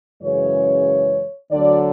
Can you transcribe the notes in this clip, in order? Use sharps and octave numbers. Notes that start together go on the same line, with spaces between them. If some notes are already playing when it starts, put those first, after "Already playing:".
F#2 C#3 E3 G#3 C#5
D2 D3 F#3 D5